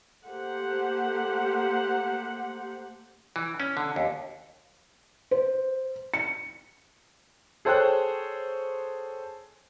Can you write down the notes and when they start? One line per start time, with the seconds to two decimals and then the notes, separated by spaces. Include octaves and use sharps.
0.25 A3 A#3 G4 C5 F#5
3.36 E3
3.60 C#4
3.77 D3
3.96 D#2
5.31 C5
6.14 C#7
7.65 G#4 A4 C5 C#5 G5 F#6